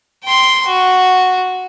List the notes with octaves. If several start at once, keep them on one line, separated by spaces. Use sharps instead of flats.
G5 C6
F#4